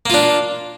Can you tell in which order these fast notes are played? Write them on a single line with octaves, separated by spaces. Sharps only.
A#3 F4 D4